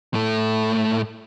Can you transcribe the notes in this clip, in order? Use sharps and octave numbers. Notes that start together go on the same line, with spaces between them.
A2 A3